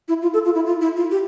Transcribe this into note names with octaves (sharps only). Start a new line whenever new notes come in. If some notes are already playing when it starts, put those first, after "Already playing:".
E4
F4
A4
F4
E4
F4
E4
F4
G4